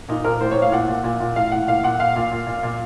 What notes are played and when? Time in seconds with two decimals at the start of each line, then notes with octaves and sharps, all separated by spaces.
0.09 A#2 D#4
0.25 A#2 A#4
0.41 A2 C5
0.51 C#5
0.57 A2 F5
0.72 A#2 F#5
0.88 A#2
1.04 A#2
1.20 A#2
1.36 A2 F5
1.52 A2 F#5
1.68 A#2 F5
1.83 A#2 F#5
1.99 A#2 F5
2.16 A#2
2.31 A#2
2.47 A#2
2.63 A#2